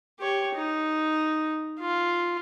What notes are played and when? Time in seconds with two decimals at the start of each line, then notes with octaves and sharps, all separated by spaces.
0.19 G4 C#5
0.55 D#4
1.80 F4